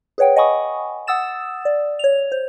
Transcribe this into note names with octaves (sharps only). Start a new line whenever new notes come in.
G#4 B4 C#5 F#5 G5
D#5 F#5 G#5 B5 C#6 D#6
F#5 D#6 E6 A6 E7
D5
C#5 F7
C5